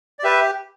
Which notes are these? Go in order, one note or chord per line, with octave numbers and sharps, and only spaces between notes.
D5
G4 B4 E5